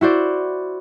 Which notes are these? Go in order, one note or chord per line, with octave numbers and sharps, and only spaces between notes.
E4 F#4 C5 D5